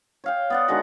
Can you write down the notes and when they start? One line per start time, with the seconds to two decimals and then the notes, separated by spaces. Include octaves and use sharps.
0.24 C#5 F5 G5
0.50 B3 D5 F#5
0.68 D3 D#3 G#3 F#4